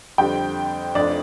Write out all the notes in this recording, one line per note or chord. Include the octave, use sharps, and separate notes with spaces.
F2 D3 G3 C4 G5
F1 F2 F3 D4 D5